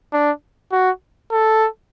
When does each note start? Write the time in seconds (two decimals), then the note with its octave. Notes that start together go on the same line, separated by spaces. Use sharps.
0.13 D4
0.72 F#4
1.32 A4